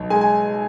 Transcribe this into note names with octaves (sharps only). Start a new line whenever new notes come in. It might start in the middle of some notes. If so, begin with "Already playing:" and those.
Already playing: B1
G#3 G#5
G#5